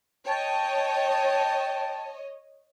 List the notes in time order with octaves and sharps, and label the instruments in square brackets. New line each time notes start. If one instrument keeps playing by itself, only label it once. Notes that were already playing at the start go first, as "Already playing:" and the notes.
[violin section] C#5 D#5 [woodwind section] G5 A5